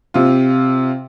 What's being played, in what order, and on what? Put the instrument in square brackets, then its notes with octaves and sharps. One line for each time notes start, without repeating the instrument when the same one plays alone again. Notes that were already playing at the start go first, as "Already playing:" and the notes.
[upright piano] C3 F4